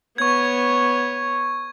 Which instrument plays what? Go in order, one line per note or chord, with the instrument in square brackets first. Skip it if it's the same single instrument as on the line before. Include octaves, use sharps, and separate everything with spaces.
[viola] B3 C#5 [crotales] C#6 G#6